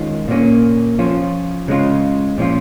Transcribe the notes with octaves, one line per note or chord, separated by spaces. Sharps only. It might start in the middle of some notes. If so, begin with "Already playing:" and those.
Already playing: D#3 G#3 C#4 F4
A#2 A#3 C#4
F3 C#4 F4
C#3 G#3 C#4 F4
A#2 F3 C#4 F4